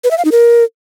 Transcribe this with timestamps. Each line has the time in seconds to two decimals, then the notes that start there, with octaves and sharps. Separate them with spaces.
0.04 B4
0.11 E5
0.18 F5
0.25 D#4
0.32 A#4